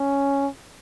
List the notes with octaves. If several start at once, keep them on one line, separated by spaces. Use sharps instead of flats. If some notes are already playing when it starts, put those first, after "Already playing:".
Already playing: C#4